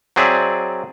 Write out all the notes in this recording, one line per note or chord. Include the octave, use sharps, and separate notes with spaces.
F#3 C4 G#4 D5 E5